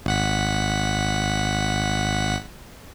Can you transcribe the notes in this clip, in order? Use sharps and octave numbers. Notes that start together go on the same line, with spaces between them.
G#1 F#5 B6